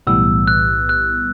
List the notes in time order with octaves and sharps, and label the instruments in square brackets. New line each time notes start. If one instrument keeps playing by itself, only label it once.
[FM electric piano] B1 A2 E3 G3 B3 [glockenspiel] E6
[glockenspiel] F#6
F#6